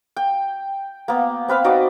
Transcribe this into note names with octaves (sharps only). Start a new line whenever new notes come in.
G5
A#3 B3
C4 B4 F5 B5
D#4 F#4 D5 D#5